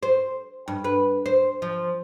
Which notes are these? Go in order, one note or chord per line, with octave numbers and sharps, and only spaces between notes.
C5
G2
B4
C5
F3